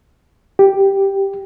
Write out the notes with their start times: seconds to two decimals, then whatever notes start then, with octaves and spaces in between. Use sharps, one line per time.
0.59 G4